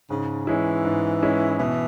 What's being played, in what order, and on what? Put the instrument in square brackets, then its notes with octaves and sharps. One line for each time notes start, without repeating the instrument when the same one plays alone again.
[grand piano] G#2 [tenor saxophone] C#3
[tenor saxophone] E3 [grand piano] G#3 C#4 E4
[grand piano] G#2
G#3 C#4 E4
[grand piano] B2 [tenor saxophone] E3